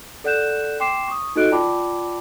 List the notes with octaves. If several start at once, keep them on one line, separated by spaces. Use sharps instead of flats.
A4 D5 F#5 F#6 G6 E7
G5 C6 D6 C7 E7
C#6 D#6
D#4 F#4 A4 D#5 F#6 D7
F4 D5 G5 A5 B5 D6